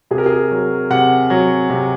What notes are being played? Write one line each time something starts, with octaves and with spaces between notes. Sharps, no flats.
C3 G#4
A#4
G#4
F#3
C3 F#5
F#3
C3